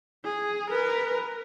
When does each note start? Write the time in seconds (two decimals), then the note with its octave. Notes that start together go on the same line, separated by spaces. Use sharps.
0.24 G#4
0.70 A#4 B4